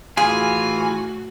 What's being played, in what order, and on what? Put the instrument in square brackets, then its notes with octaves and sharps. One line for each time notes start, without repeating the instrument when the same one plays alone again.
[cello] A2 F#4 [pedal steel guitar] E3 F4 [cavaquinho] G#4 [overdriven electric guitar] G#5